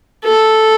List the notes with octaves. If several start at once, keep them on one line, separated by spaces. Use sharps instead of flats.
A4